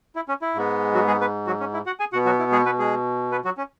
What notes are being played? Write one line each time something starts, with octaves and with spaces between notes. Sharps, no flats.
E4
C#4
E4
G#2 G#3 B3
F#3 F#4
G#3 G#4
B3 B4
F#3 F#4
C#4
E4
F#4 F#5
G#4 G#5
B2 B3 F#4 F#5
F#3 F#4
E4
G#3 G#4
B3 B4
G#3 G#4
B3 B4
F#3 F#4
C#4